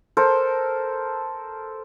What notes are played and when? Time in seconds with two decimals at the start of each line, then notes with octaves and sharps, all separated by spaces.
0.17 A4 A#4 C5